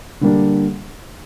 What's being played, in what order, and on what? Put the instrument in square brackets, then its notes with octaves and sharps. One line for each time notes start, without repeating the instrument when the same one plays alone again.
[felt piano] D3 G3 A#3 D4